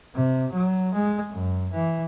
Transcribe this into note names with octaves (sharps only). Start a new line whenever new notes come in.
C3
F#3
G#3
F#2
E3